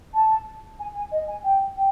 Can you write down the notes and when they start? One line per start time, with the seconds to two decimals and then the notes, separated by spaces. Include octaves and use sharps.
0.14 A5
0.79 G#5
0.95 G#5
1.12 D#5
1.27 G#5
1.44 G5
1.76 G5